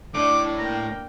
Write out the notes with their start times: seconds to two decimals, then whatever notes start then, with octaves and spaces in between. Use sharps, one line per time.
0.14 A2 D4 E4 D6
0.59 A#3 G5 A#5